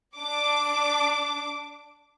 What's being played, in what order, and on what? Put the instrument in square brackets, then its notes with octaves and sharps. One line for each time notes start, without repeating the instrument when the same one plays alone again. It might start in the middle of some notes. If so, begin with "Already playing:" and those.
[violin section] D4 D6